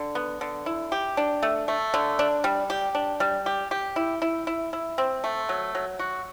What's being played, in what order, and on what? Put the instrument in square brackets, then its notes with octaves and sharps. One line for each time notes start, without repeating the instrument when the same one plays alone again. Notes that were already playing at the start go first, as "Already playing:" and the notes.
Already playing: [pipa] D3
B3
D3
E4
G4
D4
A3
A3
D3
D4
G3
G4
D4
G3
G4
G4
E4
E4
E4
E4
C4
A3
F#3
F#3
F#4